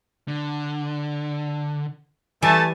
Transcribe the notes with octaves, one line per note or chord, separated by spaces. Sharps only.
D3
E3 G3 A3 G#5 A5